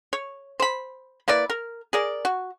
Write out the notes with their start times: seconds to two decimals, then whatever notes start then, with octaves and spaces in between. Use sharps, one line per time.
0.13 C#5
0.60 C5 B5
1.28 A#3 E4 B4 D5
1.50 A#4
1.93 G#4 A#4 D5
2.25 F#4